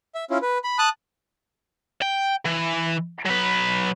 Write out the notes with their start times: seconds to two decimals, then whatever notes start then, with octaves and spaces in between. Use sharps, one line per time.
0.15 E5
0.30 C#4 E4 F4
0.42 B4
0.64 B5
0.78 A5 D#6 F#6
2.02 G5
2.45 E3
3.25 F#3 B4